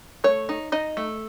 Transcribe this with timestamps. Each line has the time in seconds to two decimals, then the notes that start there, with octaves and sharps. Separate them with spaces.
0.24 A3 C#5
0.49 D#4
0.72 D#4 D#5
0.97 A3